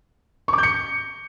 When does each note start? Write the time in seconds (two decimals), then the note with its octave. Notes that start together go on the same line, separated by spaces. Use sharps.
0.48 C#6
0.53 D6
0.58 G6
0.63 C#7